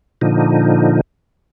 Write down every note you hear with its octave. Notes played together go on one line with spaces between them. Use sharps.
A#2 D3 F3 D#4